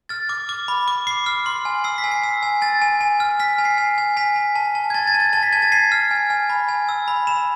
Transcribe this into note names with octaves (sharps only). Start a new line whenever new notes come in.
F6 A6
D6
D6
B5
D6
D6 C7
F6
C6
G#5
E6 C7
B6
G#5
C7
E6
G#5
G#5 A6
G#5
G#5
F6
F6 B6
G#5
C7
G#5
G#5
G#5 B6
G#5
A5
A5
G#6
A5 A6
A6
A5
A6
A5 A6
B6
A5 G#6
A6
A5 C7
F6
G#5
G#5
B5
G#5
E6
B5
B5 E7